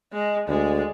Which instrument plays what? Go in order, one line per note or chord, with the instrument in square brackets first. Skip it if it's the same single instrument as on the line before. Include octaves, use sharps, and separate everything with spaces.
[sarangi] G#3 [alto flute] D#5
[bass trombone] D2 [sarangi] G#3 [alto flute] D5